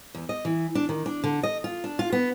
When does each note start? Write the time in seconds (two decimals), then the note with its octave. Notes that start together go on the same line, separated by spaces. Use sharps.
0.15 E2
0.29 D#5
0.45 E3
0.75 D4
0.89 D#3
1.06 D4
1.24 D3
1.43 D#5
1.64 F4
1.84 D4
1.99 F4
2.12 B3